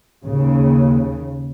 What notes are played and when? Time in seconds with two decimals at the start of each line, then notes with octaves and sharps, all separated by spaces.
0.24 D#2 C#3